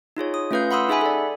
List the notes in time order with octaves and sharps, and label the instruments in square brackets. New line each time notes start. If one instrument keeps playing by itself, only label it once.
[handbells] D#4 F4 G#4 C#5
D#6
A3 C#4 F4 B4 F5 G6
F#5 B5 C6 D#6 E6
D#4 G#4 E5 F#5 G#5 B5
A4 D5